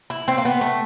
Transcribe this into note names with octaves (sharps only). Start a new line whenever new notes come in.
E4
C4
A#3
B3
A3